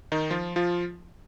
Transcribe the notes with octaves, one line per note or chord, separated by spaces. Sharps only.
D#3 D#4
F3 F4
F3 F4